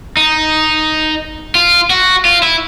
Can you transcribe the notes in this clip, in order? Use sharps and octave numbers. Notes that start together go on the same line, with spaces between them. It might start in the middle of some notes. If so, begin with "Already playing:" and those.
D#4
F4
F#4
F4
E4